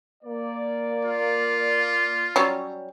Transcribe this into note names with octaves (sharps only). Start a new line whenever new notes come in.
A#3 D5
F4
F#3 G3 C#4